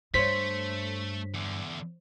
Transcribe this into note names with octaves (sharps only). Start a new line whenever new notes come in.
G2 A3 C5 C#5 B6
E2 D3